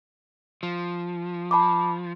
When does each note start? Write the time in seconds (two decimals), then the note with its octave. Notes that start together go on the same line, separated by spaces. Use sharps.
0.63 F3
1.51 A5 B5 D6